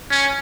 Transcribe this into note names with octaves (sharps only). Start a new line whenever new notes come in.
C#4